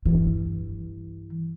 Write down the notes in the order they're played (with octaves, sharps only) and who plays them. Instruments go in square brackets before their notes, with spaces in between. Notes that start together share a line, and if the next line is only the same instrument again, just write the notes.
[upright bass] G2 E3